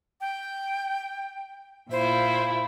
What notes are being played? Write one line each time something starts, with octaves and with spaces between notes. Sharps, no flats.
G5
A#2 E4 F4 C5